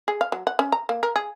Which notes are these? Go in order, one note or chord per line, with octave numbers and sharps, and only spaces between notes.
G#4
F5
F#3
F#5
C#4
A#5
A#3
A#4
G#4